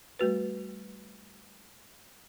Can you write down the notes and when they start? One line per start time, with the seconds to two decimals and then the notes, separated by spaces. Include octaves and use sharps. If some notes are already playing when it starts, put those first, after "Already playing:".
0.19 G3 A3 F#4 B4